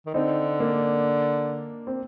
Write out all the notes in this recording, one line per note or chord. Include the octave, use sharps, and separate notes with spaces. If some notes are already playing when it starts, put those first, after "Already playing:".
D#3
D3 C4 D#4
A#3 D4
C4